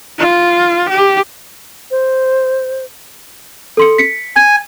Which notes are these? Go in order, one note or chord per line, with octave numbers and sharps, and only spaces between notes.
F4
G4
C5
A4 C6 C#7
B6 C#7
G#5 G#6